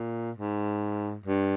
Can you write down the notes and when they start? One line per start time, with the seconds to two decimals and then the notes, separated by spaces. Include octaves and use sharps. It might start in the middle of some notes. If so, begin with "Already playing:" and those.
Already playing: A#2
0.37 G#2
1.26 G2